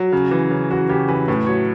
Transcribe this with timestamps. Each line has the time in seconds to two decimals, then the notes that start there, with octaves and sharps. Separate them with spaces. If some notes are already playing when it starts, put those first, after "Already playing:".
Already playing: F#3
0.13 C#3
0.31 E3
0.51 C#3
0.71 E3 F#4
0.89 C#3 G4
1.08 E3 B4
1.28 A2 B4
1.46 F#3 C#5